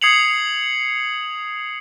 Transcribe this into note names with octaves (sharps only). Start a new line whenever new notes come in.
D#6 G#6 C7 C#7 F7 F#7